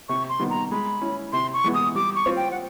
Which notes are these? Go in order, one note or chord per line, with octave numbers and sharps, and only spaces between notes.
C3 C#6
C6
D#3 G3 B3
A#5
G#3 B5
C#4 E4
C3 C6
C#6
E3 G#3 B3
D#6
G3 D6
C#6
C4 F4
G5
F#5